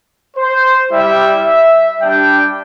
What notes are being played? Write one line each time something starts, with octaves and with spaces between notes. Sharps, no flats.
C5
G3 E4 G4 E5
E5
G3 D4 G4 G5